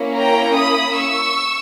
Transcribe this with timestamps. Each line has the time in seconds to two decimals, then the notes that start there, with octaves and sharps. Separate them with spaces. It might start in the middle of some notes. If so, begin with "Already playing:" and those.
Already playing: A#3 C#4 E4
0.16 G5 A#5
0.56 B5 D#6
0.96 C#6 E6